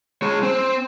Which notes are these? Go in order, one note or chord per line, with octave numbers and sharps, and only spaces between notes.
G#3 C#5
C4